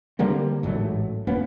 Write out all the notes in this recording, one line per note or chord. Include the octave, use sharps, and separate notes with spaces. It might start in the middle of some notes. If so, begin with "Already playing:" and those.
D3 G3 A#3 C4
A1 G#2 F#3 A3
G1 A#3 B3 C#4